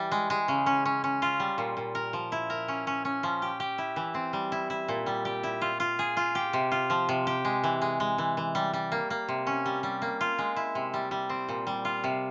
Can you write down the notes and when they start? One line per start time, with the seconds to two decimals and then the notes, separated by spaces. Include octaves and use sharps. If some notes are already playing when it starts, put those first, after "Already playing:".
Already playing: E3 G3
0.12 G#3
0.30 G#3
0.48 C#3
0.66 C#4
0.85 C#4
1.04 C#4
1.22 F4
1.40 G3
1.58 A#2
1.77 A#2
1.95 A#4
2.13 F3
2.32 E4
2.50 A#4
2.68 C#4
2.87 C#4
3.05 C#4
3.23 F3
3.42 G4
3.60 G4
3.78 E4
3.96 E3
4.15 C4
4.33 G3
4.52 E4
4.70 E4
4.88 A#2
5.06 G3
5.25 G4
5.43 E4
5.61 F4
5.80 F4
5.99 G#4
6.17 F4
6.35 G4
6.53 C3
6.72 F4
6.90 F3
7.09 C3
7.27 G4
7.45 G#3
7.64 E3
7.82 G#3
8.00 G#3
8.18 E3
8.37 E3
8.55 G3
8.74 G3
8.92 A#3
9.10 A#3
9.28 C3
9.47 C#4
9.66 G3
9.83 G3
10.02 A#3
10.21 F4
10.38 G#3
10.56 E4
10.75 C3
10.94 G3
11.11 G3
11.30 C4
11.49 A#2
11.67 G3
11.85 F4
12.04 C3